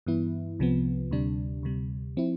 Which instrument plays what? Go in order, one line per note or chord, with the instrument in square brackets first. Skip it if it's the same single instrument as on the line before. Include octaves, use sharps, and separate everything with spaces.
[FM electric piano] G2 E3 B3 E4
C2 C3 F3 B3
D2 C3 G3 D4
D2 C3 G3
F3 C4 E4